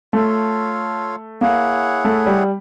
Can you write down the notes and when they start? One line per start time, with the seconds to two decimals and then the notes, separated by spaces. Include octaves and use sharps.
0.13 A3 F4 A4 C#5 F5
1.41 A#3 E4 G#4 C#5 F#5
2.05 A3
2.26 G3